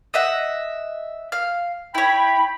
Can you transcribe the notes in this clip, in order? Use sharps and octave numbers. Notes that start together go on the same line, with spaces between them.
D#5 E5 F#5
F5
E4 C#5 G5 B5